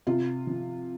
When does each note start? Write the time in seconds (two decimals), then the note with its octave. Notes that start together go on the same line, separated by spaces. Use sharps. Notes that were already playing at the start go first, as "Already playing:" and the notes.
0.07 C3 F4
0.47 F3